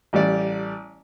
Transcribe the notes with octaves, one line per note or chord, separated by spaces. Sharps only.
A1 G3 D5